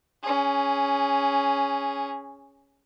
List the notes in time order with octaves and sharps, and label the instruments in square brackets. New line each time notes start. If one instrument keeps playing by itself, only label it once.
[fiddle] C#4 G#4